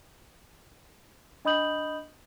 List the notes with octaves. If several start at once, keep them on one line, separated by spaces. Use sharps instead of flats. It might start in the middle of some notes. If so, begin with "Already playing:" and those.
D4 D#5 B5 D#6 G6 F#7